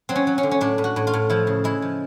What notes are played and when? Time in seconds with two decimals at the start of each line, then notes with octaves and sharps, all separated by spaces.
0.09 F#3 C4
0.16 C#4
0.27 F#3
0.38 C#4
0.43 D3
0.51 C#4
0.61 A2 D4
0.78 A2
0.84 F#4
0.96 A2
1.07 F4
1.13 A2
1.30 F3 E4
1.47 C#3
1.64 G#3 E4
1.82 F3